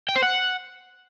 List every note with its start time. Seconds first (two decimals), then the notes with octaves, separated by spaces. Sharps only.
0.09 G5
0.16 C5
0.23 F#5